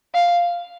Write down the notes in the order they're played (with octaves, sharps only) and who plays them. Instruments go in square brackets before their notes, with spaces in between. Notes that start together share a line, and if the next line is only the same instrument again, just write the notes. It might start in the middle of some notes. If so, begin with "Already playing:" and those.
[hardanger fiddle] F5